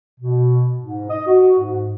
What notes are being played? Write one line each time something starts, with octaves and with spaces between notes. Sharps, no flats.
B2
G#2
D#5
F#4
G#2